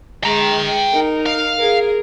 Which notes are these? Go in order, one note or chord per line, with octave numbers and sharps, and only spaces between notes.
G#3 G5 A#5
D#4 A#4
F5
G#4 A#4